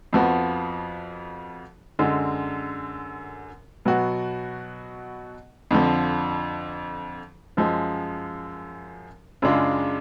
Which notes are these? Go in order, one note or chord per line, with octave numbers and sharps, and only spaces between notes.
F2 F3 B3 F#4
F#2 D3 G#3
B2 F#3 B3 F#4
F2 D3 F3
F#2 F3 G#3
F#2 C#3 G#3 D4 F4